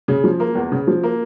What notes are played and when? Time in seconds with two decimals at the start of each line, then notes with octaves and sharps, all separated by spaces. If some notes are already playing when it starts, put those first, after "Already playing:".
0.08 C#3
0.24 F3
0.40 A#3
0.55 E2
0.72 C#3
0.87 F3
1.03 A#3